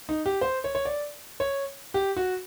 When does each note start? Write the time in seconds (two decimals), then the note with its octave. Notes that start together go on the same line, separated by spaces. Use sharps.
0.09 D#4
0.26 G4
0.41 C5
0.64 C#5
0.75 C#5
0.85 D5
1.40 C#5
1.94 G4
2.17 F#4